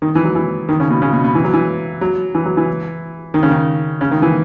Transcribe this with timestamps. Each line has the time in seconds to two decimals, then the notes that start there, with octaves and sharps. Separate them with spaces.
0.02 D#3
0.15 E3
0.24 F#3
0.35 E3
0.69 D#3
0.80 C#3
0.90 B2
1.02 C#3
1.13 B2
1.24 B2
1.35 E3
1.44 F#3
1.53 E3
2.01 F#3
2.35 E3
2.45 F#3
2.57 E3
3.34 D#3
3.43 C#3
3.51 D#3
4.01 C#3
4.11 D#3
4.22 E3